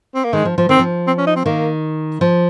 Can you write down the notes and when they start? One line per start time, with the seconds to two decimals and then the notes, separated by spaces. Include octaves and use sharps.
0.15 C4
0.24 A#3
0.33 D#3 G#3
0.45 F3
0.58 F3
0.69 D#3 C4
0.79 F3
1.07 C4
1.18 C#4
1.27 D#4
1.36 C4
1.45 D#3 A#3
2.21 F3